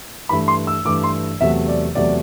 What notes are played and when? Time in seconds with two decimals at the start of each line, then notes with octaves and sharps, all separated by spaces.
0.29 G2 E3 A3 B5
0.48 C6
0.67 E6
0.85 G2 E3 A3 D6
1.04 C6
1.40 E2 C3 F#3 A3 E5
1.68 D5
1.95 E2 C3 F#3 A3 D5